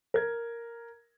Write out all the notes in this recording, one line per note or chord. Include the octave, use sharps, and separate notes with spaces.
A#4 G#6